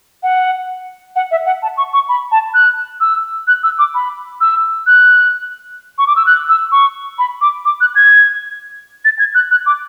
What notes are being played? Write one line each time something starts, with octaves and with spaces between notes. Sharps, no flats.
F#5
F#5
E5
F#5
A5
C#6
C#6
B5
A5
F#6
E6
F#6
E6
D6
B5
E6
F#6
C#6
D6
E6
F#6
E6
C#6
B5
D6
D6
F#6
G#6
A6
G#6
F#6
F#6
D6